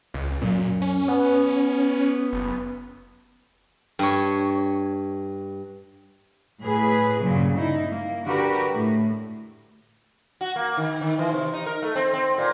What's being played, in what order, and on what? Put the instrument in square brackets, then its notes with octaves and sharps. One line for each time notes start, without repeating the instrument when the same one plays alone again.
[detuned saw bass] C#2
[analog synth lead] F#2 [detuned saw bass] A#2
[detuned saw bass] C#4
[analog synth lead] B3
[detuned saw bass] F#1
[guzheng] G2 C#5
[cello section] A2 G#4 B4
G2 A#2 C#3 F#3
D#4 E4
A#3
D3 F#4 G4 A#4 B4
A2
[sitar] F#4
A#3
D#3
D#3
E3
C3
D#4
A#4
A3
C4
C4
A#2